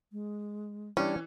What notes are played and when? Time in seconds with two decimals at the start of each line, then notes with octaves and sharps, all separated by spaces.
0.12 G#3
0.97 E3 G3 C#4 D4